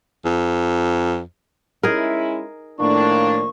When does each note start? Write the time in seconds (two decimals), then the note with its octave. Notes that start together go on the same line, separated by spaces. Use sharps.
0.25 F2
1.83 G#3 C#4 D#4 E4 G#4 A#4
2.79 A2 D#3 F3 A#3 D4 C#6